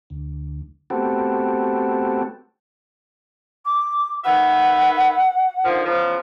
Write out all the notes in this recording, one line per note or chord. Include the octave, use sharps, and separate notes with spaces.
D2
A3 B3 C4 F#4 G4 A4
D6
D#3 B4 E5 F#5
D3 D#3 F3
E2 C#3 F3